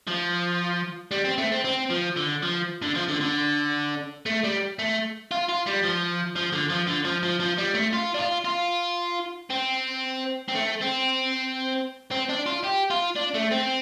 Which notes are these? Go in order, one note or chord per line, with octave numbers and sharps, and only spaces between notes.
F3
G3
C4
A3
C4
C4
F3
D3
F3
D3
F3
D3
D3
A3
G3
A3
F4
F4
G3
F3
F3
D3
F3
D3
F3
F3
F3
G3
A3
F4
D4
F4
F4
C4
C4
A3
C4
C4
D4
F4
G4
F4
D4
A3
C4